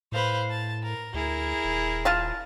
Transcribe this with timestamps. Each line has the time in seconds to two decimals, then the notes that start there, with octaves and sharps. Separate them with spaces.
0.12 A2 B4 C5 F5
0.50 A5
0.82 A#4
1.14 D2 E4 G#4 A#4
1.64 D#1
2.05 F4 F5 A5